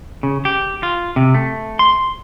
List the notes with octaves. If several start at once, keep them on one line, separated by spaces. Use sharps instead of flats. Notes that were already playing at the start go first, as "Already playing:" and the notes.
C#3
G4
F4
C3
A3
C6